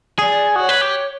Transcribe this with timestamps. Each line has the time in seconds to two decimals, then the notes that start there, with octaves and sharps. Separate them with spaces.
0.19 G#4 D5
0.56 F#4 C#5
0.69 B4
0.81 G4